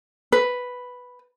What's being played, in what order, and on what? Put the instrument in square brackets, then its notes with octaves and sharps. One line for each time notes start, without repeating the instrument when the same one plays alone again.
[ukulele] B4